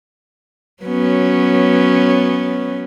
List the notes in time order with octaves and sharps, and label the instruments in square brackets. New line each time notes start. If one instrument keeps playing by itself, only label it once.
[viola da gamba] F#3 B3 C#4